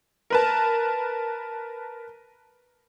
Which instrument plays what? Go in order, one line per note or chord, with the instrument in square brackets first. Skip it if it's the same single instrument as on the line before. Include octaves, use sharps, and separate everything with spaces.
[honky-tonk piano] A#4 B4 A5